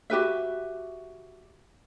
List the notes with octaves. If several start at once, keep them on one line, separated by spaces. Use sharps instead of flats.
F#4 G4 B4 E5